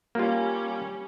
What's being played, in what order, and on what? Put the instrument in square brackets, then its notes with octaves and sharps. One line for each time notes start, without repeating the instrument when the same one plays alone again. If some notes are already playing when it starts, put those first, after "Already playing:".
[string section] G3 C#4 [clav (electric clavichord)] A#3 F4